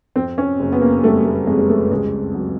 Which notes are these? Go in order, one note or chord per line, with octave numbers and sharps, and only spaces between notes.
F2 C4
C#4
F#1
B3
A#3
G3 A3
A3
F2 G#3
G#3
A3
C#2 G#3
F#3